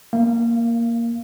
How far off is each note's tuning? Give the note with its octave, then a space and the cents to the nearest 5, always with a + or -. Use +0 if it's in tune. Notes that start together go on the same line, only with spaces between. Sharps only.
A#3 +0 F5 -25